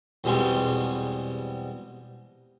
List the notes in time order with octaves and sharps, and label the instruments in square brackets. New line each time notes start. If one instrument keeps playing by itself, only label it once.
[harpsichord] E2 B2 G3 G#3 C4